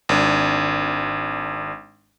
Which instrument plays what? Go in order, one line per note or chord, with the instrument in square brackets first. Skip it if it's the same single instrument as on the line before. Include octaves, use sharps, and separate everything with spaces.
[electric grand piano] G#1 D4